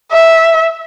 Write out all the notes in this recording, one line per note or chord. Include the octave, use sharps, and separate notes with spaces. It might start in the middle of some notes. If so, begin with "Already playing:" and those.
E5